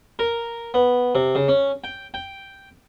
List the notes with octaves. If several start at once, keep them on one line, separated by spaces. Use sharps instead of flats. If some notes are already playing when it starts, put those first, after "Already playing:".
A#4
B3
C3
C#3
C#4
G5
G5